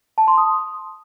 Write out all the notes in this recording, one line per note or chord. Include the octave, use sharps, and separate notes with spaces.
A5
C6
D#6